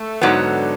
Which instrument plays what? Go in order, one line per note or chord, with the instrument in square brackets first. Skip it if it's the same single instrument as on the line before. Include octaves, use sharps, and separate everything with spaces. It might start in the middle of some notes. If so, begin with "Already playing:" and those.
Already playing: [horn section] A3
[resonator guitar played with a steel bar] G#2 F#3 B3 [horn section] D3